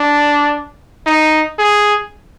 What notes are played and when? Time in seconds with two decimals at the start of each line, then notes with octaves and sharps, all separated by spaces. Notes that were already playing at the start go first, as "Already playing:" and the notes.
Already playing: D4
1.06 D#4
1.58 G#4